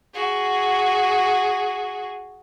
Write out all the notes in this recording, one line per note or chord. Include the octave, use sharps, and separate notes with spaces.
F#4 G#4